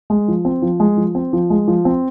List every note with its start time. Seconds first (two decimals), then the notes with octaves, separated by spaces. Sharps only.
0.10 G#3
0.28 F3
0.45 C4
0.62 F3
0.80 G#3
0.97 F3
1.15 C4
1.33 F3
1.50 G#3
1.68 F3
1.85 C4